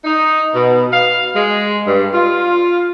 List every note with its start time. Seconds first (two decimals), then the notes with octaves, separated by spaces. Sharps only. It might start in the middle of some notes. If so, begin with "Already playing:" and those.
0.05 D#4
0.54 B2
0.93 F5
1.35 G#3
1.87 G2
2.13 F4